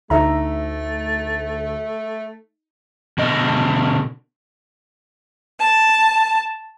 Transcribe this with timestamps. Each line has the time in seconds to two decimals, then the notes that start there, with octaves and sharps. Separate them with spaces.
0.10 D2 A3 D#4 E5 A#5
3.18 B2 D3 D#5
5.60 A5